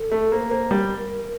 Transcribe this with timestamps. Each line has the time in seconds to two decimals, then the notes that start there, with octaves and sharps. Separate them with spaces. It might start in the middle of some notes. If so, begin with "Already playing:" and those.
Already playing: A4
0.12 A3
0.32 A#3 C5
0.41 A#4
0.51 A#3 C5
0.71 G3 A#4